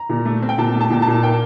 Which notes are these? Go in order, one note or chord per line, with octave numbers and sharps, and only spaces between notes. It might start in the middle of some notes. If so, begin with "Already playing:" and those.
Already playing: A#5
A#2
A3
C4
G5
A#2 A5
A3
A5
A#2 G5
A5
A#2
A#3 G5